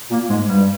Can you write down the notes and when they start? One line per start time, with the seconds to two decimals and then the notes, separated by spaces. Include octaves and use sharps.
0.10 A#2 A#3
0.29 G#2 G#3
0.47 G2 G3